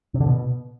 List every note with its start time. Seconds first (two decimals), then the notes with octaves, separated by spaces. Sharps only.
0.14 C3
0.20 D3
0.27 B2